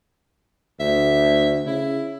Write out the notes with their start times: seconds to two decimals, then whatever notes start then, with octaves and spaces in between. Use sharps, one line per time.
0.80 D2 E5
1.66 C#3 E4